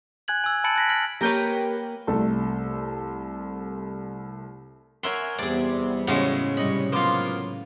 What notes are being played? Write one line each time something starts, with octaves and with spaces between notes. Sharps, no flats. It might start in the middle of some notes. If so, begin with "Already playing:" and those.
G#5 F#6 G#6 F#7
G#5 E6
A5 B5 A6 C#7 D7 F#7
F#6 A#6 B6
F6 F#7
A#3 G4 A#4 B4 C#5 G5 A#5
C2 A3 A4
A#4 C#5 E5 F#5 G#5 C6
E2 C3 G3 B3 G#4 D5
A2 C#3 G#3 F#4
G#2 C3 G3 C#5 D#5 B5
F#3 A#3 B3 F4 C5 C6 D6